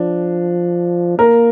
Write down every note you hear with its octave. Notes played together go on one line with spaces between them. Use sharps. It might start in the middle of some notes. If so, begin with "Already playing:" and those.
Already playing: F3 D4
A#3 A#4